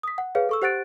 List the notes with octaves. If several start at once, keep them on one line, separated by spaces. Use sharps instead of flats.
D#6 B6
F#5
G#4 B4 C#5 F5
A4 C#6 E6
G4 C5 F#5 F#6 A6 D7